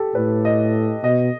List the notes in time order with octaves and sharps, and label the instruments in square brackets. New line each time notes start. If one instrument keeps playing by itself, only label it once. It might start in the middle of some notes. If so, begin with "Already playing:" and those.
Already playing: [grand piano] G4 A4
[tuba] A2 [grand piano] B4
[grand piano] D#5
[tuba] B2 [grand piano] D#5